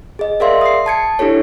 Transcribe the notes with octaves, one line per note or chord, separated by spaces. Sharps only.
G#4 D#5
G#4 A#4 D5 E5 F5 C6
D#6 C7
A5 G#6 C#7
D4 E4 G4 A4 C#5